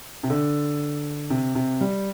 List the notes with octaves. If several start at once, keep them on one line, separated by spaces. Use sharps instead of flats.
C3
D3
C3
C3
G3